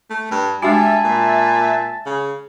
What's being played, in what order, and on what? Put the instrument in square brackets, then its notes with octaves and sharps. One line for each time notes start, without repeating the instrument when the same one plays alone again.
[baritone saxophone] A3
G2
[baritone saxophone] G3 [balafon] G#3 D4 F#4 [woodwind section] E5 G#5 A5
[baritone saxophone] A#2
C#3